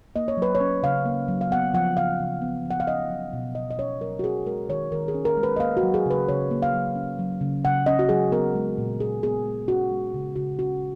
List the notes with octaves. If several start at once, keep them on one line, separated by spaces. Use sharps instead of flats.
A#3 D#5
C#5
F#3 B4
C#5
C#4
C#3 F5
A#3
F#3
F5
B3 F#5
F3 F#5
C#3 F5
C#3
B3
F3
F#5
F5
C#4 D#5
F#3
B2
B2 D#5
D#5
C#4 C#5
F#3 A#4
F#4
C#4 G#4
G#3 A#4
D#3 C#5
D#3 A#4
G#4
C#4
A#4
G#3
B4
D#5
A#3 F5
F#4
F#3
G#4
C#3 B4
C#3 C#5
A#3
F5
F#3
C#4
F#3
C#3
C#3 F#5
C#4 D#5
F#4
F#3 G#4
B3 A#4
G#3
A#2
A#2 G#4
B3 G#4
G#3
C#4 F#4
G#3
C#3
C#3 F#4
C#4 F#4